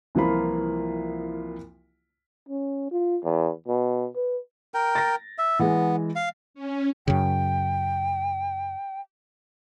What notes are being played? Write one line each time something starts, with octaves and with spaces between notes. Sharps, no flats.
C2 E3 F3 A#3 F4 B5
C#4
F4
E2
B2
B4
A#4 G5
A6 A#6
E5
E3 G#3 B3
F5
C#4
F#2 C#3 G5